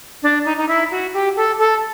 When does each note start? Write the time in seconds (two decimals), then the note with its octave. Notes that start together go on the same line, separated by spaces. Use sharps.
0.23 D4
0.45 D#4
0.57 D#4
0.68 E4
0.91 F#4
1.14 G4
1.36 A4
1.59 A4